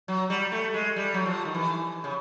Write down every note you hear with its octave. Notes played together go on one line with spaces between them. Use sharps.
F#3
G3
A3
G#3
G3
F#3
F3
D#3
E3
C#3